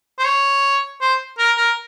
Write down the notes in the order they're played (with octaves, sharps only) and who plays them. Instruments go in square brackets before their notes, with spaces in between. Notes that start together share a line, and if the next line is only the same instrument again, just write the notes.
[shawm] C5
C#5
C5
A#4
A#4